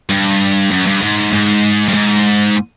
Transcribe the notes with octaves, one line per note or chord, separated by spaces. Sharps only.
G2
F#2
G2
G#2
G#2
G2
G#2